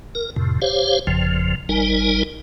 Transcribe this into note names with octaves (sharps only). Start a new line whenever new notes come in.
A#4
F2 A2 C3
G4 C5 C#5 F5
G1 F2 C#3 F3
G#1 G3 D#4 A#4 G#5